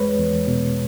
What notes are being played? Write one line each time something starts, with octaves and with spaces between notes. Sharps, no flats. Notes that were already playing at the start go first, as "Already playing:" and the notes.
Already playing: E2 G#3 B4 C#5
E2
B2